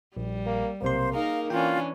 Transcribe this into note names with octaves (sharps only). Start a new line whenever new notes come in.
A#1 G3
A#3
B1 C3 A#3 C5 C6
D#4 G#4 A#4 F5
E3 C#4 D4 F4 G5